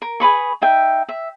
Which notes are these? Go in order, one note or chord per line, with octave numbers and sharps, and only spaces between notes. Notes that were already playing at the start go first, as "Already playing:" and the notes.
A#4
G#4 B4 B5 C#6
D#4 E5 G5
E5